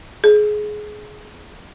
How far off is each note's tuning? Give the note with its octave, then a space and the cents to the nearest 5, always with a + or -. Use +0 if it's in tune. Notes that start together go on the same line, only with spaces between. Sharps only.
G#4 +20